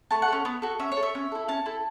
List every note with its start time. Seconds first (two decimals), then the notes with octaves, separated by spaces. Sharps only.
0.11 A3 A5
0.22 F#5
0.28 C#4 A4
0.45 B3
0.62 F#4 A4
0.79 C#4 E5
0.92 C#5
0.97 A4
1.03 E5
1.15 C#4
1.32 E4 A4
1.48 C#4 A5
1.66 E4 A4